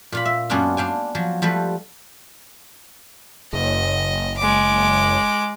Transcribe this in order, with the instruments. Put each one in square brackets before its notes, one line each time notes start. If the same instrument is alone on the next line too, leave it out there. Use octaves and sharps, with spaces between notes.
[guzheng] A#2 F4 B5
E5
F#2 A#3 B3 C#4 D4 F4
D4 F5 G5 G#5
F3 F#3
F3 G3 A3 B4
[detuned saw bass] F#1 [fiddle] D#5
[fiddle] G#3 D6